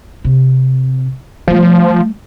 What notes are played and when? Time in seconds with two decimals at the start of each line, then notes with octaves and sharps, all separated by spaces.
0.25 C3
1.48 F3 G3 A3